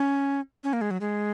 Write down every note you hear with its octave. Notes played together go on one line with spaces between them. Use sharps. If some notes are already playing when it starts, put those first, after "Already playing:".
Already playing: C#4
C#4
A#3
G#3
F#3
G#3